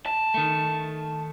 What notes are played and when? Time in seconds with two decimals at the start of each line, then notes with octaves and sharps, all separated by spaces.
0.06 A5
0.34 D#3 A3